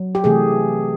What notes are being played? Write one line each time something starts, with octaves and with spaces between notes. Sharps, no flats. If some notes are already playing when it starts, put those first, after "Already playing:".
Already playing: F#3
G4
C3 E3 A3 G#4